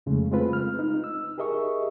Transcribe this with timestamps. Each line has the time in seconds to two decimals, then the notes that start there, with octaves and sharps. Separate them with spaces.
0.06 F2 C#3 G#3 A3
0.31 G#3 A3 C4 F4 B4
0.53 F6
0.79 D#4
1.04 E6
1.38 G4 G#4 A#4 D#5 E5 C#6